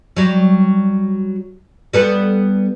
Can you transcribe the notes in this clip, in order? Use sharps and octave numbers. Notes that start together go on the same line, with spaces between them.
F#3 G3
G3 B3 A4